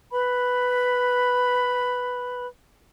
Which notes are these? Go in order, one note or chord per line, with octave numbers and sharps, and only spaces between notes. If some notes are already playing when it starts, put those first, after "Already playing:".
B4 B5